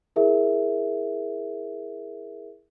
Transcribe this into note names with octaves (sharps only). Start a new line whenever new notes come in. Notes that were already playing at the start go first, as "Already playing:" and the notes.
E4 G#4 A#4 E5